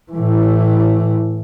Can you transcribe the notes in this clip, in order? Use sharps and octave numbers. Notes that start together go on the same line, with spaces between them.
A2 E3